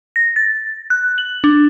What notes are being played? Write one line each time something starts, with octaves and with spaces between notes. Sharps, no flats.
A#6
A6
F#6
F#7
D4